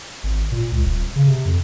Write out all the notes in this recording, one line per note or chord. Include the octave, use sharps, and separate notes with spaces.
G#1
A#2
C#2
D#1
C#3
C3
F2